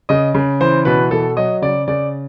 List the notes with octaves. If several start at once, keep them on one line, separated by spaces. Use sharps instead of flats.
C#3 D#5
C#3
E3 C5
B2 B4
B2 A4
F#3 D#5
C#3 D5
C#3 D5